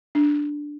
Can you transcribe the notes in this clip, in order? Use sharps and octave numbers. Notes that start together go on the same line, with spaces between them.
D4